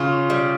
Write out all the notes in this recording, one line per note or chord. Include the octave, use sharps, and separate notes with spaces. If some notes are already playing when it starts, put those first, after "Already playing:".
Already playing: C#3 F4
G3